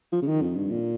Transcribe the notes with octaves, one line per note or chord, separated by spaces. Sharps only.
F3
C#3
D#3
F2
G2
A#2